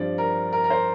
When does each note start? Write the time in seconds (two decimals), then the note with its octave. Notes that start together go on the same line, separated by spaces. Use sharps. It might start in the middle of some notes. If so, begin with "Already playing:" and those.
Already playing: G2 F3 C4 D5
0.18 A#4
0.53 A#4
0.64 A#4
0.70 C5